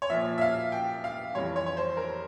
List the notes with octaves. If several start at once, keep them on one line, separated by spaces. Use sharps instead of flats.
C#5
A#2 F3 E5
E5
F5
G5
F5
F2 E3 G3 C#5
C#5
C#5
C5
A#4